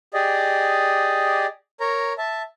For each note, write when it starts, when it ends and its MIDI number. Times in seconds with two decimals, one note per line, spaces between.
0.14 1.46 67
0.14 1.46 68
0.14 1.46 74
0.14 1.46 75
1.80 2.13 70
1.80 2.13 73
1.80 2.13 82
2.18 2.42 76
2.18 2.42 81